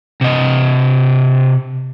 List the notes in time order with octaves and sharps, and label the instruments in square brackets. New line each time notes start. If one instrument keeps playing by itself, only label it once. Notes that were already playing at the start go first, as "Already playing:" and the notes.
[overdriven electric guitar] C3 D#5